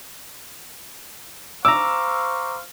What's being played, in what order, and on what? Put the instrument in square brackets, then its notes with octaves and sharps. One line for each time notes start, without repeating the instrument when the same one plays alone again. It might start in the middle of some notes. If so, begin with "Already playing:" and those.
[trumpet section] C5 F5 C#6 [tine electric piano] A#5 D6 [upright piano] E6